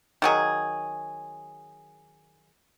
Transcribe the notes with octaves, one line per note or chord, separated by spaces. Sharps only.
D#3 F#3 G#4